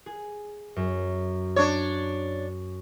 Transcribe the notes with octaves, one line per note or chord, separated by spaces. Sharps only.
G#4
F#2
D4 C#5